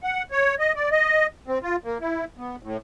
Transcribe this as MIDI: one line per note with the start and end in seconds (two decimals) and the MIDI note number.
0.03 0.23 78
0.31 0.55 73
0.59 0.73 75
0.76 0.89 74
0.91 1.26 75
1.48 1.58 60
1.63 1.76 65
1.84 1.98 58
2.01 2.25 64
2.37 2.56 59
2.63 2.77 45